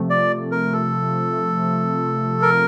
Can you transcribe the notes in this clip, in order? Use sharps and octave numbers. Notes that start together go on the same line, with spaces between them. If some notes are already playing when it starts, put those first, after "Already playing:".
Already playing: C3 F3 A3
D5
A#4
A4
A#4